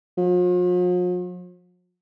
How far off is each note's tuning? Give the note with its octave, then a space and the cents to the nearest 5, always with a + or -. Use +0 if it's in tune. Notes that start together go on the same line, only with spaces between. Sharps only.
F3 +45